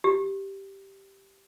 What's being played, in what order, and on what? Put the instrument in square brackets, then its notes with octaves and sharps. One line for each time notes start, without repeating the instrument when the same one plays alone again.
[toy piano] G4